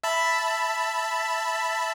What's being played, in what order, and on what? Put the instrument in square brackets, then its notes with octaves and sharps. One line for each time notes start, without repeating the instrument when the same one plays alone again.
[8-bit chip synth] E5 A5 B5